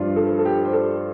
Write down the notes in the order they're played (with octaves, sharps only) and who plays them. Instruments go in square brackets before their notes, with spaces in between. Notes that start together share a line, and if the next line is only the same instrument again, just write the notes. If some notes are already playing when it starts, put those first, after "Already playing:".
Already playing: [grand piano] G2 F3 D4 F4
[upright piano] A4
A4
G4
C5
A4